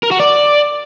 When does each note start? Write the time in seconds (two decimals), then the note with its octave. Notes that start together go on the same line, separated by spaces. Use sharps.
0.03 A#4
0.11 F#4
0.20 D5